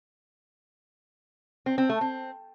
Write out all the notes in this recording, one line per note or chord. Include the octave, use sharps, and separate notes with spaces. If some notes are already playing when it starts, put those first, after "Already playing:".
C4
C4
A3
C4